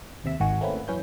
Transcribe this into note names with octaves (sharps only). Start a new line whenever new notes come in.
D#2 C3 E5
G#1 D#3 F#4 G#5
A3 A#3 C4 C#4 E4 B4
F#2 E3 C#4 B4 G6